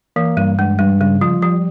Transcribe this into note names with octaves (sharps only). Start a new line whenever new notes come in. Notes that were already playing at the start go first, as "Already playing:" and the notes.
E3 A#3
G2 G3
G2 G#3
G2 G3
C#3 G3
F3 F4
F3 G3